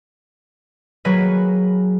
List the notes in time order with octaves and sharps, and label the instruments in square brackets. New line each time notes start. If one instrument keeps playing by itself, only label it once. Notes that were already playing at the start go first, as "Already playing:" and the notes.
[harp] F#3 A#3 G#4 B4